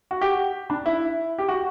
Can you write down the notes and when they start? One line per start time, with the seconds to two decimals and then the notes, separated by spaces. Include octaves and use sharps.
0.11 F#4
0.21 G4
0.70 D4
0.86 E4
1.38 G4
1.49 F#4